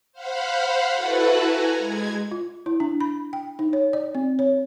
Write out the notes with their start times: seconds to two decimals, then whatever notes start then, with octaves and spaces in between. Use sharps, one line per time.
0.13 C5 F5 F#5 B5
0.94 E4 F#4 A4 B4 F#5
1.40 G#5 A#5
1.78 G#3 G#6
2.32 F4
2.66 E4
2.80 D4
3.01 B5
3.33 G5
3.59 D#4
3.73 C#5
3.93 D5
4.15 C4
4.39 C#5